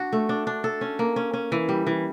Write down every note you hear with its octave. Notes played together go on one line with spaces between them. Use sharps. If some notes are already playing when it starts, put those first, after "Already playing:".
Already playing: D4 F#4
A3
D4
D4
A4
C#4
A#3
C#4
C#4
E3
G3
E3